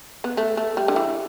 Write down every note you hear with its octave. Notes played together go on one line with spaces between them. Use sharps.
B3
A3
A3
G3
D3
E3